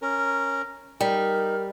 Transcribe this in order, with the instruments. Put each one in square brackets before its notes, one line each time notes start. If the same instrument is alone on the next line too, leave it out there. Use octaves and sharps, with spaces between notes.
[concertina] C#4 A#4
[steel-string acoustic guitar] G3 [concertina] D#4 [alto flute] A#4